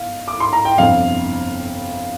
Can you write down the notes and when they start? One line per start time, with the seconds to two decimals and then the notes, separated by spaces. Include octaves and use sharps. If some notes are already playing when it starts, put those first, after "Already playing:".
Already playing: G1 F5
0.28 D6
0.40 C6
0.53 A#5
0.65 G5
0.78 G1 F2 C3 F5